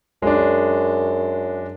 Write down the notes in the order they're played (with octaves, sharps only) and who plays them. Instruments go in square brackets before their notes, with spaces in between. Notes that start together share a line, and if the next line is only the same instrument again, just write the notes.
[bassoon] F#2 [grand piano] G#3 D4